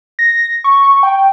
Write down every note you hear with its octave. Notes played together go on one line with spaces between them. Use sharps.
A#6
C#6
G5